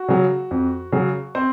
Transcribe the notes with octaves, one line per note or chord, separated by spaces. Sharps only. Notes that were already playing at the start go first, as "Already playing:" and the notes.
Already playing: F#4
C#3 F#3
F2
C#3 F#3
C4 C5